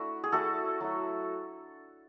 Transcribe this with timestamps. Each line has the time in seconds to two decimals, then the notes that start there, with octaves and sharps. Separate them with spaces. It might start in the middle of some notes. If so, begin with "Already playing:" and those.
Already playing: A3 D4 E4 F#4
0.24 G#4
0.32 A3 E4 F#4 A4
0.81 F#3 A3 E4